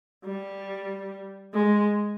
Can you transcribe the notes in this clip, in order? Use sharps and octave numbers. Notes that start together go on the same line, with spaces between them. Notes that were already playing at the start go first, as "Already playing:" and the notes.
G3
G#3